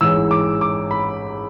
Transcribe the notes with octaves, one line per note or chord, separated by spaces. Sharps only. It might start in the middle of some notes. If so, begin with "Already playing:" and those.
A1 G#2 E3 E6
D6
D6
B5